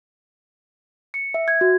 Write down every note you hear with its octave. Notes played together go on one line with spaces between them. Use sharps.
C#7
E5
G#6
F#4